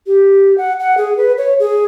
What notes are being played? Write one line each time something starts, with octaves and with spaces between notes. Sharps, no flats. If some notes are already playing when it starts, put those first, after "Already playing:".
G4
F#5
F#5
G#4
B4
C#5
G#4